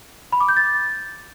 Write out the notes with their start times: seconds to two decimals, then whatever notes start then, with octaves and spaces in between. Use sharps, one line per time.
0.32 B5
0.41 D6
0.49 G6
0.57 A6